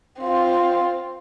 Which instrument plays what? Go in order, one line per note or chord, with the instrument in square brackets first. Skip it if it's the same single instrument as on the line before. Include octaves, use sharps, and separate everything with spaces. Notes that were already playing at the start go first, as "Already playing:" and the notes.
[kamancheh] C4 F4